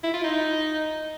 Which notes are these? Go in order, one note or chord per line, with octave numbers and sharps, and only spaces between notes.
E4
F4
D#4